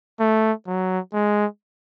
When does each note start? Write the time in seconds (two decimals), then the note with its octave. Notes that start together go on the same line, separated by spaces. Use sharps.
0.20 A3
0.67 F#3
1.13 G#3